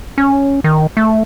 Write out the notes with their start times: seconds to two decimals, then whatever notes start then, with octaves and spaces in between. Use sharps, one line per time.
0.18 C#4
0.64 D#3
0.97 A3